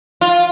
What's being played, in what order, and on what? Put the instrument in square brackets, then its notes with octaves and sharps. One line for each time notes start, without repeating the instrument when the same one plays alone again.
[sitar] F4